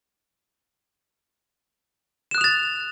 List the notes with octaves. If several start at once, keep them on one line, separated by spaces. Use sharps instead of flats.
D#6 F#6 A6 E7 F7